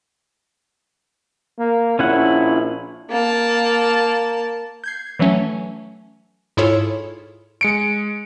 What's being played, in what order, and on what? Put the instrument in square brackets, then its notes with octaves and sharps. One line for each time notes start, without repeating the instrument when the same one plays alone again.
[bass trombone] A#3
[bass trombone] A#1 [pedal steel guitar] C#4 E4 F#5
[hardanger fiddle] A#3 A5
[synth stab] G6 G#6 C7
E3 F#3 A3 C#4
G#2 E4 F4 G#4 A4 C#5
[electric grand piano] G#3 C#7 D7